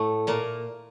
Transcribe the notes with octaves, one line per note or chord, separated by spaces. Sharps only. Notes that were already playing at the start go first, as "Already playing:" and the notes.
Already playing: A2 A3
A#2 A#3